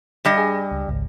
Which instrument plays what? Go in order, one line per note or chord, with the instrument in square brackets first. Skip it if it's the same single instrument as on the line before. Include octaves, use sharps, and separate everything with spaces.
[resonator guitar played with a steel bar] G2 G3 D#5
[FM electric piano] G#4
C#2
G#1 C#2